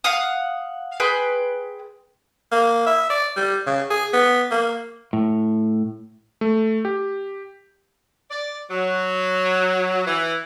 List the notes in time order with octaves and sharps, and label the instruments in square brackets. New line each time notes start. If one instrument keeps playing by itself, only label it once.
[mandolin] F5 F#5 D#6
G#4 B4 G5 C6
[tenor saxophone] A#3
E5
D5
G3
C#3
G#4
B3
A#3
[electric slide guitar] A2
[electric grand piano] A3
G4
[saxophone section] D5
F#3
E3